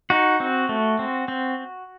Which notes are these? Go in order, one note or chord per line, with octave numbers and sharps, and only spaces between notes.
D#4 F#4
C4
A3
C4
C4